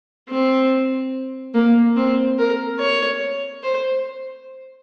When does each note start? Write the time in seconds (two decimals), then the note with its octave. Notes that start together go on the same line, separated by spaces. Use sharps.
0.29 C4
1.54 A#3
1.96 C4
2.38 A#4
2.80 C#5
3.63 C5